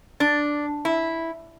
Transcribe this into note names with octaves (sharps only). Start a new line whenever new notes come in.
D4
E4